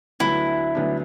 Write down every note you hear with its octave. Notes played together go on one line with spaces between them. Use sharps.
D2 D3 F#3 B3 D4 E4
D2 D3 F#3 B3 D4